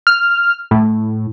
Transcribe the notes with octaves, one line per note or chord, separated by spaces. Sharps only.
F6
A2